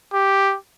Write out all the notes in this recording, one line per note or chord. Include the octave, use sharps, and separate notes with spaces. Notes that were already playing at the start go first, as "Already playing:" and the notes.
G4